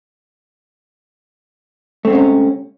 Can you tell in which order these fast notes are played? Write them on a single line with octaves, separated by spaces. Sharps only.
A3 C4 G#2 C#4 C3